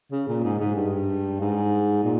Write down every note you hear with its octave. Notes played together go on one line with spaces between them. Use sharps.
C#3
A#2
G#2
G#2
G2
G#2
A#2